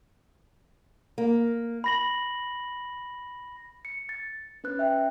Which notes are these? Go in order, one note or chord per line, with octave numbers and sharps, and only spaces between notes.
A#3
B5 A#6 F#7
C#7
A6
C#4 B4 F#6
E5 G5